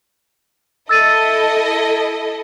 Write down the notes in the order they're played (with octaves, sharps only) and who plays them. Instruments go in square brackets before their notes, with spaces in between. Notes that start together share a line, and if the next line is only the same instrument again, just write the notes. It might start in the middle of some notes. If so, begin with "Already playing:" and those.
[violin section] E4 A4 D#5 [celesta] E6 A6 D#7